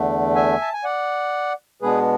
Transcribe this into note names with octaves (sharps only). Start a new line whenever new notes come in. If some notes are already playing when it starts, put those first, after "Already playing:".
Already playing: E2 D3 A3 D4
E5 G#5
A5
G#5
D5 F#5
B2 G#3 B3 D4 G#4 B4